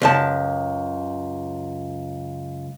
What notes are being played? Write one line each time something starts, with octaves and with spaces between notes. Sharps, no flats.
C#2 F#2 A5